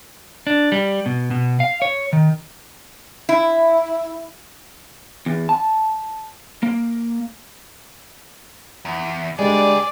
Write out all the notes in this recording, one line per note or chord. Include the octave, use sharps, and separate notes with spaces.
D4
G3
B2
B2
F5
C#5
D#3
E4
E2
A5
A#3
E2
C#2 D3 G3 G#3 G#4 D5